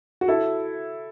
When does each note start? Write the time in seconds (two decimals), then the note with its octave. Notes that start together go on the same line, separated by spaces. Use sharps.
0.21 F#4
0.28 E4 A4